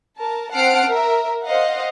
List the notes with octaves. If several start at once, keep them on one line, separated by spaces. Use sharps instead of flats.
A#4 A5
C4 F#5 A5 F6 C7 D7
A#4 E5
C5 D#5 F5 F#5